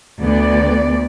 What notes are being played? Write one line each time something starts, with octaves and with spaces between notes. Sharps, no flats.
D2 B3 D5